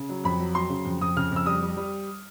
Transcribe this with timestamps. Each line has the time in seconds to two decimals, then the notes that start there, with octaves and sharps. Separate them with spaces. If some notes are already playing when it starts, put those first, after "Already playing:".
Already playing: C#3
0.09 F#3
0.24 F2 B5
0.40 F#3
0.55 F#3 C6
0.70 C#3
0.85 F2
1.01 F2 D#6
1.16 C#3 F6
1.31 F2
1.36 E6
1.46 G3 D#6
1.62 G3
1.77 G3